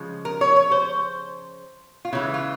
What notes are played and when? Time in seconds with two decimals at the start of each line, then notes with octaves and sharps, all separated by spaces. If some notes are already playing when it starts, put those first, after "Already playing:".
Already playing: C#3 F3 G#3
0.25 A#4
0.41 C#5
0.56 C#5
0.71 C5
2.05 F4
2.13 C#3 E3 G#3 E4
2.34 F4